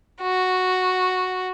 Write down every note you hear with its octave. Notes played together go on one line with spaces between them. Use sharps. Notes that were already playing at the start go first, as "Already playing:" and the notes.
F#4